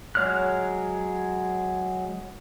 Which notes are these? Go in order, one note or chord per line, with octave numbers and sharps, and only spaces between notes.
F#3 G#3 C#5 F6 F#6